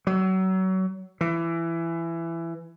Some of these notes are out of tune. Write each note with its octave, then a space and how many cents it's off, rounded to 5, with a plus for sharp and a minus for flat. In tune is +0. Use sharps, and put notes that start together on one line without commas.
F#3 +30
E3 +20